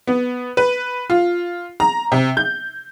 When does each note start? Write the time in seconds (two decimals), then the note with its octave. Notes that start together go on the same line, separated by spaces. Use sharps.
0.07 B3
0.57 B4
1.10 F4
1.80 A#5
2.12 C3
2.37 G6